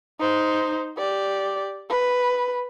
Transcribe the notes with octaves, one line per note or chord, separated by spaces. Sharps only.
D#4 C5
G4 D5
B4